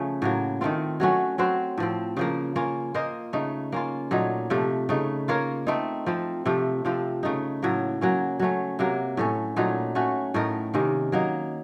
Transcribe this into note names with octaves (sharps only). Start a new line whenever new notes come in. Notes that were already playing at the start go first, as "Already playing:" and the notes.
Already playing: C#3 F3 A3 C#4
A2 F#3 A#3
D#3 A3 C4 F4
F#3 A3 C#4 F#4
F#3 C4 F#4 C5
A2 F3 C4
C#3 F3 A#3
A#3 C#4 F4
A#3 F4 C5 D#5
C#3 A3 D#4
A#3 C#4 F4
A#2 F#3 A3 D#4
C3 F3 A3
C#3 A3 D#4
A#3 F4 A#4 C#5
A3 C4 D#4
F3 C4 F4
C3 F3 A3
C3 F3 C4 F4
C#3 A3 D#4
A2 F#3 A#3
F#3 A#3 C#4
F#3 A3 C#4
C3 F#3 A#3
A2 A3 C#4
A#2 F#3 A3 D#4
A3 C#4 F#4
A2 A3 D#4 A#4
C3 D#3 A#3 C#4
F#3 A#3 D#4